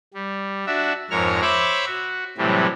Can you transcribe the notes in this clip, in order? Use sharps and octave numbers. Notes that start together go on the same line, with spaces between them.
G3
D4 F#4 E5
F2 G#2 A#4 C#5 F6
C5 C#5 E5 B5 C#6 D6
F#4
A2 C3 E3 F#3 G3